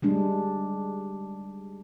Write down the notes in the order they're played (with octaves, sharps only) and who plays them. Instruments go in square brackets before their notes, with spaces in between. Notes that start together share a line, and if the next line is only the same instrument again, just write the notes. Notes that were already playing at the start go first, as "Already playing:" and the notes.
[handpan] G3 G#3 D4